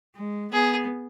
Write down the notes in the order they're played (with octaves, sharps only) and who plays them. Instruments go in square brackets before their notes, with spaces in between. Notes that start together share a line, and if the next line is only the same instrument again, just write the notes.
[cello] G#3
[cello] B3 [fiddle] G#4